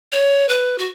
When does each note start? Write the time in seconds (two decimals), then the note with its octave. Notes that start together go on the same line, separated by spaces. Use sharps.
0.12 C#5
0.49 B4
0.78 F#4